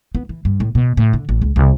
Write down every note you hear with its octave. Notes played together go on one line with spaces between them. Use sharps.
B3
E3
G2
A2
B2
A2
D3
A1
C#2
C2